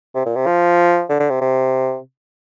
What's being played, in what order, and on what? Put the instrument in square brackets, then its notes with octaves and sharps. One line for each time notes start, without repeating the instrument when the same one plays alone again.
[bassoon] C3
A#2
C3
F3
D3
D3
C3
C3